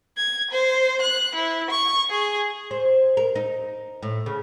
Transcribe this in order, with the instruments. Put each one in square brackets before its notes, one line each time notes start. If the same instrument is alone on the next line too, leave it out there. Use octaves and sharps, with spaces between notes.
[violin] G#6
C5
F#6
E4
C#6
G#4
[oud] C5
A#4
D#4
A2
C#3